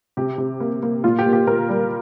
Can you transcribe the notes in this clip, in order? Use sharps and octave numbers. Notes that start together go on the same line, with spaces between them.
C3 G4
C3
A#3
A#3
A#2 F4
G4
A#3
G4
A#2 A#4
G3